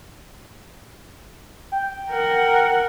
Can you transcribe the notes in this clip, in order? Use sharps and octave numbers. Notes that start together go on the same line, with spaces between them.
G5
A#4 F#5